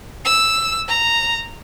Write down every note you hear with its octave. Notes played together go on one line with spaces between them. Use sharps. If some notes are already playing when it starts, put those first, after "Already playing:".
E6
A#5